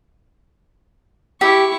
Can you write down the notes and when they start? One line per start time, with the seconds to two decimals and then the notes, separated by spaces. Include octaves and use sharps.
1.41 E4 G4 C#6